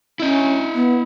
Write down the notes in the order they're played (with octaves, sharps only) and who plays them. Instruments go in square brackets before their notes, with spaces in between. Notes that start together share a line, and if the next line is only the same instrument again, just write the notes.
[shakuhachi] C#4 [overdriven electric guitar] E4 D#5
[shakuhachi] B3